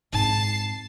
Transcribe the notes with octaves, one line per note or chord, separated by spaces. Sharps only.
G#2 C4 A5 C7